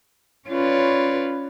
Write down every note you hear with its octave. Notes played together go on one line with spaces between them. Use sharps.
C#4 F4 B4 C#5 D5